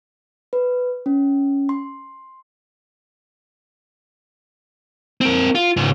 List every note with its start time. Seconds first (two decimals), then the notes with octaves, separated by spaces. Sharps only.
0.53 B4
1.06 C#4
1.69 C6
5.21 C4 A#4
5.55 F4
5.77 C#2 G#2